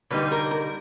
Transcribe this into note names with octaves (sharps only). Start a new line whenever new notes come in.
D3 G3 A#3 D#4 B4
A#4
A#4